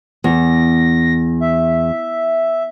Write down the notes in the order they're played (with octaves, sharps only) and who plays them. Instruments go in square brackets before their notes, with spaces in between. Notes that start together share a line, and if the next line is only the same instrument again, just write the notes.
[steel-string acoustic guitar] E2 [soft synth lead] A#6
[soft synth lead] E5